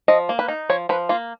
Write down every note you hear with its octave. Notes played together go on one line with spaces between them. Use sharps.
F3 D#5
A#3
B4
D#4
F3 C#5
F3 B4
A#3 F4